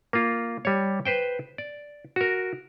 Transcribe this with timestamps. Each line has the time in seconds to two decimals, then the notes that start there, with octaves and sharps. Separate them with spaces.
0.13 A#3 F4
0.65 G3 C#5
1.05 B4 C5 G5
1.58 D5
2.16 F#4 A#4